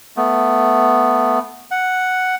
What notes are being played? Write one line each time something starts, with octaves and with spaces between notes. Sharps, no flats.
A3 B3
F#5